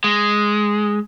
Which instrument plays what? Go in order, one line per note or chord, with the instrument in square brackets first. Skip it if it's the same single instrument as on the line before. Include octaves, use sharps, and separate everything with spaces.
[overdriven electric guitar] G#3